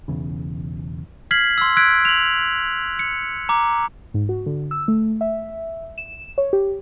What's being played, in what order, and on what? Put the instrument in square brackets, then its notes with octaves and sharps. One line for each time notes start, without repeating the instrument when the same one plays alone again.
[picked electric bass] B1 E2 C#3
[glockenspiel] F6 G#6 B6 C7 F#7
C6 E6
E6 F#6 G#6 B6 D7
F7 F#7
C#7
A#5 D6
[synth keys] G#2
F#4
D3
E6
A3
E5
E7
C#5
G4